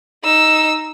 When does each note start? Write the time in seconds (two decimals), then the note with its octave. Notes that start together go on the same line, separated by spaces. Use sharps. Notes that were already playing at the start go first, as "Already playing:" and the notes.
0.24 D#4 E6